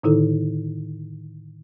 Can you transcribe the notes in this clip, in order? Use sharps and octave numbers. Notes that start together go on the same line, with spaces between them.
A2 D3 D#3 D#4 E4 A4